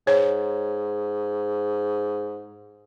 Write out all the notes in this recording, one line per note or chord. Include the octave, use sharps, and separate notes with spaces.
G#2 C#5